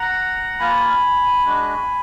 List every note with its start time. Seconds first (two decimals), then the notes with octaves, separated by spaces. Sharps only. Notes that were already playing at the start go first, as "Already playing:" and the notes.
Already playing: F#5 A#5
0.60 A#3 F4 G#5 B5
1.45 G#3 D4 F#4